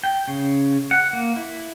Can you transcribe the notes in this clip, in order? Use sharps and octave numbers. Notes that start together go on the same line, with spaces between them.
G5
C#3
F#5
A#3
E4